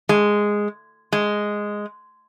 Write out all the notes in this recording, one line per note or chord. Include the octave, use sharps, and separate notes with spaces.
G#3
G#3